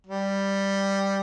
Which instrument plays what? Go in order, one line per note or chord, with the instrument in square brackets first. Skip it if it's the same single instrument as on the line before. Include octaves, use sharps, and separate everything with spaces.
[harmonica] G3